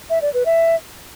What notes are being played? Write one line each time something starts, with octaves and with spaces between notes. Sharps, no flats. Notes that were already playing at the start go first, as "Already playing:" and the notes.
E5
D5
B4
E5